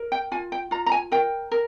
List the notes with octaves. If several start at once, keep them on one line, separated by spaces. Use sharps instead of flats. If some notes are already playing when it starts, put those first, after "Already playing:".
Already playing: A#4
G5
F4 G#5
G5
F4 A#5
A#5
G#5
A#4 G5
A#4